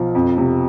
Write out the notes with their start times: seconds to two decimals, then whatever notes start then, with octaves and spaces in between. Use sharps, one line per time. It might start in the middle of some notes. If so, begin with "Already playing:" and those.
Already playing: B1 F3
0.15 F2
0.38 C3